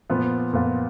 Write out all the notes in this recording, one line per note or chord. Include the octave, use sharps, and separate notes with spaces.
A#2 F3 B3 F4
A#2 F3 B3 F4